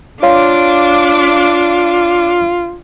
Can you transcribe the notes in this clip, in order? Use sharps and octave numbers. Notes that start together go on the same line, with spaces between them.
D4 F4 C#5 F5 C6 D6